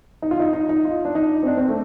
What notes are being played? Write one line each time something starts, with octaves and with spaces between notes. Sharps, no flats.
D#4
F4
D#4
D#4
D#4
F4
D4
D#4
C4
D4
C4
A3